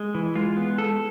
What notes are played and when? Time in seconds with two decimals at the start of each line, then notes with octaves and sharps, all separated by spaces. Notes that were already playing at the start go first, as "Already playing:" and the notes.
Already playing: G#3
0.15 E3
0.35 G#3 F4
0.57 B3
0.78 A4